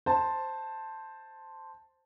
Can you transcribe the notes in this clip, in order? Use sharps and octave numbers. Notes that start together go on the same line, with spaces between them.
C5 A5